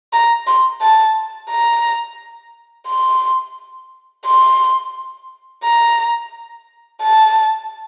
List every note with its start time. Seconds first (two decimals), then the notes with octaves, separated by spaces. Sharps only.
0.13 A#5
0.47 C6
0.82 A5
1.50 A#5
2.88 C6
4.26 C6
5.64 A#5
7.02 A5